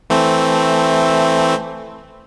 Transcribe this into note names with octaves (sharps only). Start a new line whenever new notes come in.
E3 A3 C4